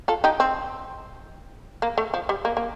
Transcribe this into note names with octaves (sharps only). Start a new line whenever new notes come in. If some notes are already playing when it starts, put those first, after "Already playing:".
F4 A4
D#4 G4
C4
A#3
A3
F3
G3
A#3
A#3